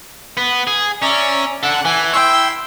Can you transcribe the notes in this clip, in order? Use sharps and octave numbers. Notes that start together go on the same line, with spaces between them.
B3
G#4
C#4 D5 E5 A#5
D4 A4 F#5
E3 G#5
E4 C#5 G5 C6 E6